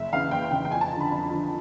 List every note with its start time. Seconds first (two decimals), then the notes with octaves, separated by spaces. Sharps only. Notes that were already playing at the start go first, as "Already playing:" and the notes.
Already playing: F#1 E5
0.13 E2 C#3 F5
0.31 F#1 G5
0.51 E2 C#3 G5
0.65 G5
0.71 F2 G#5
0.81 A5
0.91 F3 A#5
0.95 D3
1.00 B5
1.11 F2
1.30 D3 F3